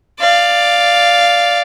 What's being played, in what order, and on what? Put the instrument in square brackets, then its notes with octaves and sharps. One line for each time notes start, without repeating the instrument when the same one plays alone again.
[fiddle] D5 F5